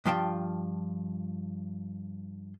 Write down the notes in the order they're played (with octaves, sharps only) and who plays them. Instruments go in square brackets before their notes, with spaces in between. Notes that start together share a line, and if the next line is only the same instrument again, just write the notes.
[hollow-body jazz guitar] G2 F3 F4 G5 A5